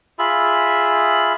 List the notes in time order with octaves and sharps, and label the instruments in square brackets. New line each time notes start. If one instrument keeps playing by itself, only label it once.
[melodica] F4 G#4 E5 B5